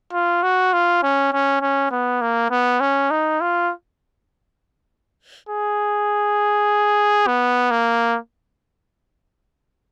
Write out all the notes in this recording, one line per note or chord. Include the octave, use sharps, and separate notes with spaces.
F4
F#4
F4
C#4
C#4
C#4
B3
A#3
B3
C#4
D#4
F4
G#4
B3
A#3